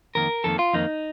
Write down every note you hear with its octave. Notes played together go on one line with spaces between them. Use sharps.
F2 D#3 A#3 A#4
F2 D#3 A#3 A4
F4
F2 D#3 A#3 D#4